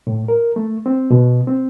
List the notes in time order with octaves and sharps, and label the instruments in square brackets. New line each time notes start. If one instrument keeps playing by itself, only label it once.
[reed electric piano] A2
A#4
A3
C4
B2
C4